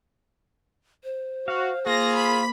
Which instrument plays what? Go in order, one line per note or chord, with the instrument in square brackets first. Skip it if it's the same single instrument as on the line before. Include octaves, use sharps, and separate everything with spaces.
[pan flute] C5
[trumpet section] F#4 [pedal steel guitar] F5
[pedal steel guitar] A#3 [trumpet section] F4 G#4 [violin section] A#6
[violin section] B5